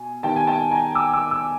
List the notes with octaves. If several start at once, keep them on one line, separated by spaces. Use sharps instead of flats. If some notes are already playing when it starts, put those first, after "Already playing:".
Already playing: B2 G#5
D#3 G3 B3 G5 A5
G#5
G5 A5
G#5 A#5
D6 E6
D6 E6
D6 E6